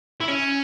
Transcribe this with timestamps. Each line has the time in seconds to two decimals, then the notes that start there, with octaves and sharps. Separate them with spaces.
0.20 E4
0.28 C#4